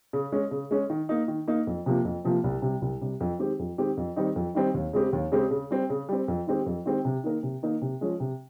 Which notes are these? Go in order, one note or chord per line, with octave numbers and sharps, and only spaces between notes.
C#3
G#3 C#4
C#3
G#3 C#4
D#3
A#3 D#4
D#3
A#3 D#4
F2
C3 F3 A#3
F2
C3 F3 A#3
C2
C3 G3
C2
C3 G3
F2
D#3 G#3 C4 G4
F2
D#3 G#3 C4 G4
F2
D#3 G3 C4 D#4
F2
D#3 G3 C4 D#4
D#2
C#3 G#3 C4 G4
D#2
C#3 G#3 C4 G4
C#3
G3 C4
C#3
G3 C4
F2
D#3 G#3 C4 G4
F2
D#3 G#3 C4 G4
C3
D#3 A#3 D#4 A#4
C3
D#3 A#3 D#4 A#4
C3
F3 G#3 C#4
C3